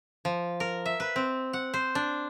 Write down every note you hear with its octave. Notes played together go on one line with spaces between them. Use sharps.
F3
A#4
E5
B4
C4
F#5
C5
D4